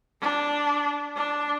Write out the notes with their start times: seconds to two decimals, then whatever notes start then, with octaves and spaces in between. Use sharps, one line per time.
0.21 D4
1.16 D4